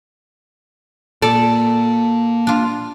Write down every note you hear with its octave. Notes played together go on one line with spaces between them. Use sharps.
A#2 A4 D5
D4 F4